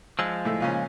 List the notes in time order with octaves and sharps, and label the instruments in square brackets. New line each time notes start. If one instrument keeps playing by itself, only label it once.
[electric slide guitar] F3 G#3 [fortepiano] E6
[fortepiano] A2 E4 A4
A#2 C#3 C#4